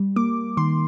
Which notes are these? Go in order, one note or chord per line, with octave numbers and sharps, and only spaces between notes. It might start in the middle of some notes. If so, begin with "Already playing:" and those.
Already playing: G3
A#3 D6
D#3 C6